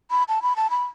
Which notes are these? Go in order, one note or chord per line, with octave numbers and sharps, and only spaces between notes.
B5
A5
B5
A5
B5